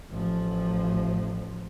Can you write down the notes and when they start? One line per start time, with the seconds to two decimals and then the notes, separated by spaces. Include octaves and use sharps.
0.11 A1 F3